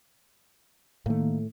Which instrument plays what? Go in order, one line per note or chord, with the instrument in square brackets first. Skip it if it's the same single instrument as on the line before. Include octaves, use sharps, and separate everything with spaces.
[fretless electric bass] A2 A3 [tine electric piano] D#3 A#3